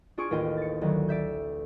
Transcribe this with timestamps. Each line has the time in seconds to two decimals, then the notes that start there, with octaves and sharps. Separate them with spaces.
0.17 D4 F4 G#4 C#6 F6 D7
0.30 A1 D#2 F4 D#5 G5
0.57 A6 C#7
0.81 D2 D#3 F#3
1.08 D5 E5 G6